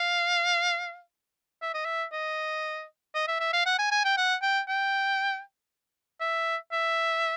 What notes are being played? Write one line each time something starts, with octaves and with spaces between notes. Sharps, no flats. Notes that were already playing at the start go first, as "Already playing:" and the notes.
Already playing: F5
E5
D#5
E5
D#5
D#5
E5
E5
F5
F#5
G#5
G#5
G5
F#5
G5
G5
E5
E5